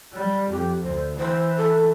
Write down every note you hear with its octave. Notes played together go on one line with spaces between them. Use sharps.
G3
F2 G4
D2 C5
E3 C5
A4